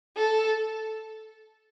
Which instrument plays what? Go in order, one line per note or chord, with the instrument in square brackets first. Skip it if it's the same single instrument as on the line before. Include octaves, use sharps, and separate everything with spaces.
[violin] A4